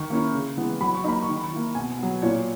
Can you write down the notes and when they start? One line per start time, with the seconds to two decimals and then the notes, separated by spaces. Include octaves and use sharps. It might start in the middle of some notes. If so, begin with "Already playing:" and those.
Already playing: D#3 C#6
0.10 A#3 C#4 E4
0.34 C#3
0.57 E3 G#3 B3
0.81 F#3 B5
0.95 C#6
1.04 A#3 D#4 B5
1.22 C#6
1.28 D#3
1.36 B5
1.52 A#3 E4
1.75 B2 G#5
1.99 F#3 B3
2.22 A#2 C#5